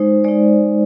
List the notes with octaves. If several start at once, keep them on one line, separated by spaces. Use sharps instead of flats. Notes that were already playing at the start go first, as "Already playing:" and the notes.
Already playing: G#3 D#4 C5
G#3 D#4 D5